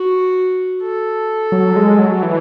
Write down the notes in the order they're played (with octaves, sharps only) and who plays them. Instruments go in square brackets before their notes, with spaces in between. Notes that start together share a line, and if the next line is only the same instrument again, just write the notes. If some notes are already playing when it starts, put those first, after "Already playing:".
Already playing: [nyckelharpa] F#4
A4
[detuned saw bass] F#3
G#3
F#3
E3